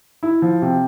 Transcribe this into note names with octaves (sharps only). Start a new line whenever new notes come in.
E4
F3
C3